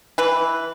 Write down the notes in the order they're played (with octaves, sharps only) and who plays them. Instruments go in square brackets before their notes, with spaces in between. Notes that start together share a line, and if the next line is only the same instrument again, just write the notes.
[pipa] E3 B4